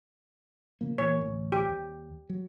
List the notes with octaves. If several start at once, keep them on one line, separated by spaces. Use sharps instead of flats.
C#3 F3 A#3
A#2 E3 A#3 C#5
D1 A1
G4
D#2
F#3